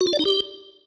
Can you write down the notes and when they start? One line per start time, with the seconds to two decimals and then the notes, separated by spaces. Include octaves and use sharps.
0.01 F#4
0.07 F4
0.13 D5
0.19 D#4
0.25 G4